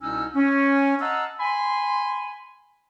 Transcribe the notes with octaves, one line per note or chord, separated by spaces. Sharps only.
C2 B2 C#4 D#4 E6
C#4
D#5 F5 F#5 A5 A#5 E6
G#5 B5 C6